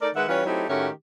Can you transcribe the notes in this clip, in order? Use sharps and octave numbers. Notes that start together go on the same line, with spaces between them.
A3 D#4 A#4 D5
D#3 G#3 B4 E5 F#5
E3 G3 C#4 F4 B4 C#5
F#3 A3 C4 D#4 E4 G4
A2 D#3 A3 C#4 F#4 G4